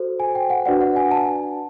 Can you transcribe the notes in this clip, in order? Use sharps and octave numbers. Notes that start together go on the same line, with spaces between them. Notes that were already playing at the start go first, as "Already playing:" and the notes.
Already playing: F#4 A4 C5
G#5
G5
F#5
D4 F#4 B4 D5 F#5
F#5
G#5
A5